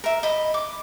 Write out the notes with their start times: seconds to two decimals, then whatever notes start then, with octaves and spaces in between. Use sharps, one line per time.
0.04 A#4 E5
0.23 D#5 B5
0.54 D6